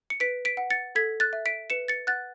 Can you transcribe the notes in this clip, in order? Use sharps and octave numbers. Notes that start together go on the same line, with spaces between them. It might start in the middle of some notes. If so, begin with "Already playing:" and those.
C#7
B4 B6 D7
B6 D7
F#5
A6 C#7
A4 G#6 B6
F#6 A6
E5
B6 D7
B4 C#7 E7
A6 C#7
F#5 F#6 A6